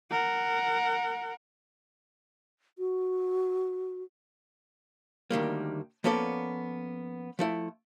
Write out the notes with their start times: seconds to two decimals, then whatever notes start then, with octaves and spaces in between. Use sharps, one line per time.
0.11 A#4 F#5
2.79 F#4
5.31 D2 D#3 G3 A#3
6.04 F3 A#3 B3 C#4 A4 D5
7.39 F3 A3 E4